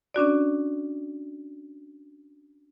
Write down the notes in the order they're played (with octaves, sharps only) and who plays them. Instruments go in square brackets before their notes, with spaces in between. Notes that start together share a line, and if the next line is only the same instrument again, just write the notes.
[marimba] C#4 D4 F#4 D5